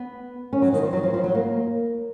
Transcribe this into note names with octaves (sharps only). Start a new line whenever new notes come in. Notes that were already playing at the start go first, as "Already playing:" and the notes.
Already playing: B3
C#4
F#3
D#3
F3
F#3
F3
F3
F#3
A#3